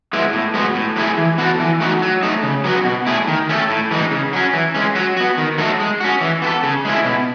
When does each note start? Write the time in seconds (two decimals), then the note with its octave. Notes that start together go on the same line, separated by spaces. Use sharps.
0.13 G#3 B3 E4
0.33 A2
0.54 G#3 B3 F#4
0.75 A2
0.96 F#3 A3 E4 G#4
1.18 E3
1.38 B3 F#4 A4
1.60 E3
1.80 A3 D#4 F#4
2.02 F#3
2.23 A3 D#4
2.43 C#3
2.64 F#3 B3 F#4
2.85 B2
3.06 A3 E4 G#4
3.28 D#3
3.49 A3 C#4 F#4 A4
3.70 A2
3.91 E3 G#3 D#4
4.11 C#3
4.33 F#3 C#4
4.53 E3
4.74 G#3 C#4
4.95 F#3
5.17 B3 F#4
5.38 D#3
5.58 F#3 A3 D#4 A4
5.80 G#3
6.01 C#4 F#4
6.21 E3
6.42 B3 F#4
6.47 A4
6.63 C#3
6.85 G#3 C#4 E4
7.05 B2